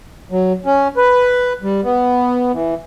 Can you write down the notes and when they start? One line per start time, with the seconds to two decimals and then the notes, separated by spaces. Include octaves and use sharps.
0.32 F#3
0.66 C#4
0.97 B4
1.63 G3
1.84 B3
2.53 E3